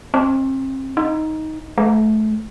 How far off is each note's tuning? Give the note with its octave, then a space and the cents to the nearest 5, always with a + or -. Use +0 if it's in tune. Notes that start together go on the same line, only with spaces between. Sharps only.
C4 +35
D#4 +10
A3 -25